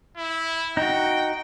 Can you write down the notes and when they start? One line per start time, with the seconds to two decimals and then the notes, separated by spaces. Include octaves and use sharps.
0.17 E4
0.77 D#4 F#4 G5